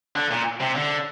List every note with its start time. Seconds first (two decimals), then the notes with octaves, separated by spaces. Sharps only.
0.16 D3
0.31 A#2
0.60 C3
0.75 D3